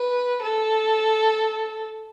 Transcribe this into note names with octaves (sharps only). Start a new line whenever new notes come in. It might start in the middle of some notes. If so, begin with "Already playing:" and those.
Already playing: B4
A4